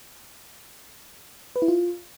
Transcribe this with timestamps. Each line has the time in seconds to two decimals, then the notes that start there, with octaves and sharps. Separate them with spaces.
1.56 B4
1.62 E4
1.68 F4